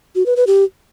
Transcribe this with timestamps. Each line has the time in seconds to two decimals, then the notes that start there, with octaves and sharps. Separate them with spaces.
0.15 F#4
0.26 B4
0.36 B4
0.47 G4